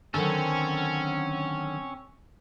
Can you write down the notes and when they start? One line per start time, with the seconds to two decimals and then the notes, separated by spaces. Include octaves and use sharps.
0.14 D3 D#3 F#3 C4 C#4 A4